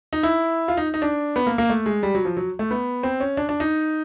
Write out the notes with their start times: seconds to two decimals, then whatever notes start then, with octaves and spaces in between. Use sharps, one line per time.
0.13 D#4
0.23 E4
0.68 F4
0.77 D#4
0.94 D#4
1.02 D4
1.36 B3
1.47 A#3
1.58 A#3
1.69 A3
1.86 G#3
2.03 G3
2.14 F#3
2.25 F3
2.37 F#3
2.59 A3
2.71 B3
3.03 C4
3.20 C#4
3.37 D4
3.49 D4
3.60 D#4